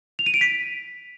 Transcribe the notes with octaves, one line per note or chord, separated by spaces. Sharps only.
F7
D#7
D7
B6